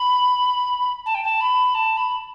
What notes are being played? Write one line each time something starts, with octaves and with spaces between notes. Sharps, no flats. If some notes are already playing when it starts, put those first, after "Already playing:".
Already playing: B5
A5
G5
A5
B5
A5
B5